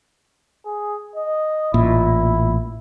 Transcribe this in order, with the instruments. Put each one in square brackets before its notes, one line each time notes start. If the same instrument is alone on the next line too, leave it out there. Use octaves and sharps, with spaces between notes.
[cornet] G#4
D#5
[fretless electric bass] A1 A#2 [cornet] E4